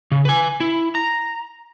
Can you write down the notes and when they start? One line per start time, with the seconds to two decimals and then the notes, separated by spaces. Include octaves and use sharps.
0.12 C#3
0.25 B4 G#5
0.60 E4
0.95 A#5